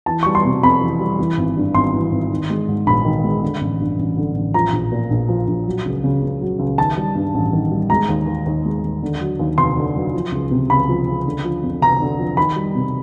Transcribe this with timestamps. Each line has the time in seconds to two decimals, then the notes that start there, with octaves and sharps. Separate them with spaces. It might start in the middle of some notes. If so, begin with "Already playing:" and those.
0.06 E3 A5
0.23 G3 C#6
0.35 C6
0.44 C3
0.63 F2 B5
0.81 E3
1.00 G3
1.19 E3
1.37 G#1
1.57 G2
1.74 G#1 C6
1.93 E3
2.12 G#1
2.31 D#3
2.50 G#3
2.68 G#2
2.87 A#1 B5
3.05 D#3
3.24 G#3
3.42 D3
3.61 A1
3.80 G2
3.99 A1
4.17 D3
4.35 A1
4.54 F3 A#5
4.73 A#1
4.92 A#2
5.10 A#1
5.28 F3
5.48 A#1
5.67 F#3
5.85 C#2
6.04 C#3
6.22 C#2
6.41 F#3
6.59 C#2
6.78 D#3 A5
6.97 G3
7.15 G2
7.34 A1
7.53 D#3
7.71 G3
7.90 G#3 A#5
8.09 D#2
8.27 D#3
8.46 D#2
8.65 G#3
8.83 D#2
9.03 D3
9.21 F#3
9.39 D#2
9.58 F1 C6
9.77 D3
9.95 F#3
10.14 F3
10.32 C#2
10.51 C3
10.70 C#2 B5
10.89 F3
11.07 C#2
11.26 D3
11.44 F3
11.63 F2
11.82 F1 A#5
12.00 D3
12.19 F3
12.37 D#3 B5
12.56 G3
12.75 C3